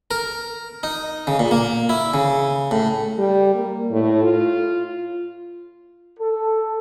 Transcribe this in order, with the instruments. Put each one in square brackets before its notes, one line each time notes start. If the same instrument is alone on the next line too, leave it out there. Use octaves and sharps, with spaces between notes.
[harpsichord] A#4
D#4
C#3
A#2
A#3
E4
C#3
A2
[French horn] G3
A#3
A2
F4
[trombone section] A4